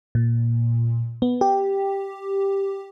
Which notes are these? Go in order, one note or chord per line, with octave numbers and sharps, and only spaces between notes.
A#2
B3
G4